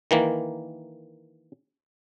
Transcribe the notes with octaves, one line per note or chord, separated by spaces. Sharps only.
D#3 E3 A#3